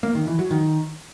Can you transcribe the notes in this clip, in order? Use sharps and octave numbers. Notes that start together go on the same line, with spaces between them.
A#3
D#3
E3
F#3
D#3